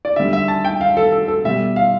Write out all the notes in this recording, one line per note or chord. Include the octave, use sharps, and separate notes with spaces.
D5
D3 G3 E5
E5
A5
G5
F5
A4
A4
A4
B2 G3 E5
F5